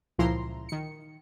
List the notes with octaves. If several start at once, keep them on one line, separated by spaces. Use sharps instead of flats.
C#2 A#2 F3 E4 A#5 C6
D#3 C#7